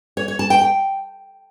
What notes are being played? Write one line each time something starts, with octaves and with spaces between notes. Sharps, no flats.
C#5
C#5
A5
G5
G5